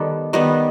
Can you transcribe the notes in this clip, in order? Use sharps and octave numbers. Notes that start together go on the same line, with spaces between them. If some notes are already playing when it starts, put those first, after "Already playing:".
Already playing: D#3 G3 B3 A4
D#3 G3 B3